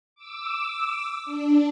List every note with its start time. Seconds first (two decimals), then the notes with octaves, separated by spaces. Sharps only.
0.15 D6 E6
1.25 D4